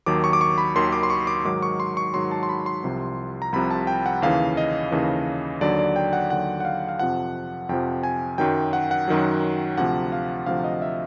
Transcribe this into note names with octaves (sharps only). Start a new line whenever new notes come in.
D#2 D#3 F#3 D6
C#6
D6
C#6
B5
D#2 D#3 F#3 C6
D6
C6
C#6
D6
G#2 D#3 F#3 D6
C#6
C6
C#6
G#2 D#3 F#3 C6
A5
C6
B5
C6
C2 C3 F3
A#5
C2 C3 F3 B5
A5
G5
F#5
D#2 C#3 E3 F5
D#5
D#2 C#3 E3
D#2 D3 F#3 D5
D5
G5
F#5
D#2 D3 F#3 F#5
F#5
F5
F5
F2 C3 F3 F#5
F2 C3 F3 G5
G#5
F#2 D#3 F#3 G5
F#5
F#5
F#2 D#3 F#3
D2 C3 F3 F#5
F5
D2 C3 F3 F5
D#5
E5